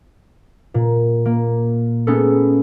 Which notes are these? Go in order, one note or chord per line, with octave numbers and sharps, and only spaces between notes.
A#2
A#3
A3 B3 C#4 D#4 G#4 A4